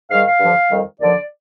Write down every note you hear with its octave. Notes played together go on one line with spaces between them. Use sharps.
G#2 D#3 G3 F5
F5
G2 D3 F3
F2 D#3 G3
D#2 D3 F3 D5